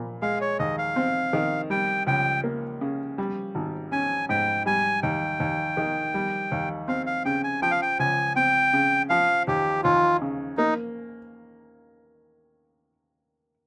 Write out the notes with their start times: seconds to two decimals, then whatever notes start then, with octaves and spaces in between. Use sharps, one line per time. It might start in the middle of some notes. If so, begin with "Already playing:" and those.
Already playing: A#2
0.22 G#3 F5
0.41 C#5
0.59 D#2 D#5
0.78 F5
0.96 C4
1.33 D#3
1.70 G3 G5
2.07 C#2 G5
2.44 A#3
2.81 C#3
3.18 G3
3.55 G#1
3.92 C#4 G#5
4.29 G#2 G5
4.66 G3 G#5
5.03 D#2 G5
5.40 D#2
5.77 D#3
6.14 G3
6.51 D#2
6.88 C4 F5
7.06 F5
7.25 C#3 G5
7.44 G#5
7.62 F3 G5
7.71 F5
7.82 G5
7.99 C#2 G#5
8.36 C4 G5
8.73 C#3
9.10 F3 F5
9.47 D#2 G4
9.83 D#2 F4
10.21 C#3
10.57 A#3 D#4